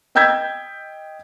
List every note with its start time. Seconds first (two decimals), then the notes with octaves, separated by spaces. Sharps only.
0.15 D#5 G5 E6 G6 G#6 B6